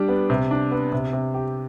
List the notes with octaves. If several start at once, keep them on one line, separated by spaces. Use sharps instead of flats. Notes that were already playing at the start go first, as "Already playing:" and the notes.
Already playing: G3 D4
B3
C3
D4
B3
C3
C3
G4